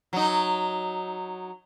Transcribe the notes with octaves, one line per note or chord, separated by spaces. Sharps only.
F#3 D#4